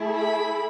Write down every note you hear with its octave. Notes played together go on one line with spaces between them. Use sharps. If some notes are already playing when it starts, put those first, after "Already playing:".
Already playing: A3 E4 G#4
B5